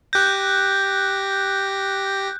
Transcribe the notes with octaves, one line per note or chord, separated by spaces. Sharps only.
G4 F#6 G6 A#6